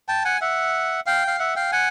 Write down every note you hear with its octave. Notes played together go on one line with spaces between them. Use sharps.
G5 A5
F#5 G#5
E5 F#5
F5 G5
F5
E5 F#5
F5 G5
F#5 G#5